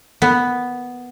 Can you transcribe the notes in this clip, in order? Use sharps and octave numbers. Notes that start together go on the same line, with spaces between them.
B3